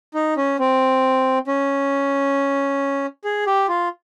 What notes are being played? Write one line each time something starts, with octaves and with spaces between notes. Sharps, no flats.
D#4
C#4
C4
C#4
G#4
G4
F4